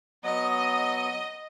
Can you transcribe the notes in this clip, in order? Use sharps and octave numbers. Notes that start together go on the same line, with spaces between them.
F#3 B3 D#5